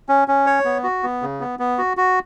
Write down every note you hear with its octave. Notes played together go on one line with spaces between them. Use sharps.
C#4
C#4
C#5
B3
F#4
B3
C#3
B3
B3
F#4
F#4